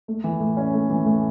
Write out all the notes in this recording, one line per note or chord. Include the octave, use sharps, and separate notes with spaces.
A3
E3
A2
C#4
A3
E3
A2